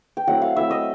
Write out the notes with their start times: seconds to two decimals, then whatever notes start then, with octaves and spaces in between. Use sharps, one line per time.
0.17 G5
0.27 F#3 A3 C4 E4 F#5
0.42 F5
0.56 F#3 A3 C4 E4 E5
0.71 D#5